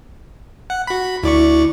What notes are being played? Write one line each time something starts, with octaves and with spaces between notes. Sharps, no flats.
F#5
F#4 B5
D2 E4 D5 C#6